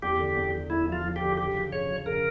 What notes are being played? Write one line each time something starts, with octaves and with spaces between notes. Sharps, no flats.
E2 G4
D3
E2
D3
E2 E4
F3 F4
F3
G4
D3
C#3 G4
F3
C#3 C#5
F3
C#3 A#4